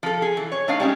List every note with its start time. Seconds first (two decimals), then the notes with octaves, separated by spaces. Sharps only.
0.03 F3 A4
0.22 G#4
0.37 E3
0.52 C#5
0.68 A3 D4 D#4 F5
0.80 G3 G#3 C#4